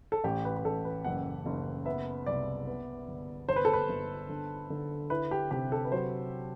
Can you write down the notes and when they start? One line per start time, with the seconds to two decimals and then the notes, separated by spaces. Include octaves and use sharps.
0.12 A4
0.24 A1 G4
0.45 B4
0.56 B4
0.65 A1 A4
0.85 B4
1.04 F#1 F#5
1.46 F#1
1.86 B3 E5
2.26 C2 D5
2.67 B3
3.08 G1
3.48 G1 C5
3.56 B4
3.65 A4
3.73 B4
3.89 G1
4.29 D3
4.70 D3
5.10 E4 B4
5.31 G4
5.51 C3 G4
5.72 A4
5.85 B4
5.91 F#3 C5